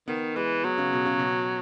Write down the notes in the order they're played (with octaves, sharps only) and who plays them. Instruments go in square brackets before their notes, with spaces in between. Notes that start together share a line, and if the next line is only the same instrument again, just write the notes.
[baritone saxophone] D#3 [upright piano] B3
[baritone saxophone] E3 [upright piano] G#3
[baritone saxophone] F#3 [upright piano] B3
[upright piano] C#3
B2
C#3
B2